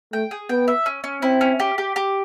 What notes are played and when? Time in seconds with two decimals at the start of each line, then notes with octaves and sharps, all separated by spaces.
0.13 A3 G5
0.31 G#4
0.49 B3 G5
0.68 E5
0.86 C#4
1.04 C#4
1.22 C4 E4
1.41 C#4
1.60 G4
1.78 G4
1.96 G4